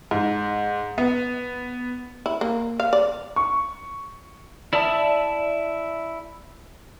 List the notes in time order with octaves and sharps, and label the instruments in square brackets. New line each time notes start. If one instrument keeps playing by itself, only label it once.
[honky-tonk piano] G#2
B3
[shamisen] E4
A#3
F5
D5
[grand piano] C#6
[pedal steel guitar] E4 D5 E5 A5 D#6